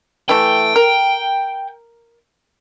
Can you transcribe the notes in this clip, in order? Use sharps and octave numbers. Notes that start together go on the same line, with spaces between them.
E3 A3 G5
A#4